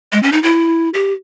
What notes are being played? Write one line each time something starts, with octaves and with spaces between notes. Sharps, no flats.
G#3
C#4
D#4
E4
G4